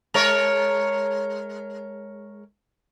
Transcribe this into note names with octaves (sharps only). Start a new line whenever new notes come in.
G#3 A#4 C#5